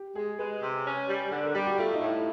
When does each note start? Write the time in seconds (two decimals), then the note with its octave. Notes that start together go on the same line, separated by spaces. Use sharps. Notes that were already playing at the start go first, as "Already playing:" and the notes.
Already playing: G4
0.15 G#3 G#4
0.39 G#3 B4
0.62 C3
0.85 C#4
1.08 G3
1.31 D3 D5
1.43 A#4
1.55 G3 G4
1.66 F#4
1.78 A3 F4
1.93 D#4
2.01 A2 E4